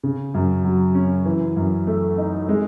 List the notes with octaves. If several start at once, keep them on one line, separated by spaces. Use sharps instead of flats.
C#3
F#2
F#3
C#4
E3
F#2
A3
D#4
G#3